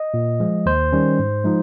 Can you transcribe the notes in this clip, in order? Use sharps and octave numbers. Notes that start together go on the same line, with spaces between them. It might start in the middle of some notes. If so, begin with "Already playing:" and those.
Already playing: D#5
A#2
F3 G#3
D#2 C5
D#3 G3 C#4
G#2
F3 G#3 D#4